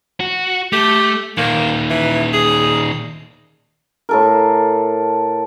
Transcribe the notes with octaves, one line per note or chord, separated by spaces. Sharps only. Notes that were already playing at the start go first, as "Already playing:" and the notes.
F#4
A3 G4
A#2 D#3 A#3
E3
G#4
A2 A4 A#4